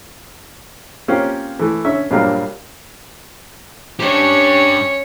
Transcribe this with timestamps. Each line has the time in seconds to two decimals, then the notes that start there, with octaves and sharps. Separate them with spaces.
1.08 A#3 C4 C#4 F4 G4 A#4
1.59 E3 A3
1.85 D3 C#4 E5
2.11 A#1 G2 F#3 G3 A#3 F5
3.99 C#4 D4 G4 C#5